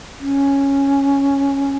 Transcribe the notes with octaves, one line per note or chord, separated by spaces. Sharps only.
C#4